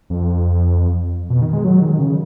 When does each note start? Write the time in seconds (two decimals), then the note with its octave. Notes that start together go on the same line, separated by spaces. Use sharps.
0.10 F2
1.30 B2
1.41 D#3
1.53 G#3
1.64 F#3
1.82 D#3
1.99 C#3